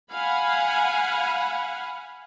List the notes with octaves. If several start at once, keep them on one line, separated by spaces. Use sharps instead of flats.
F5 F#5 G#5 B5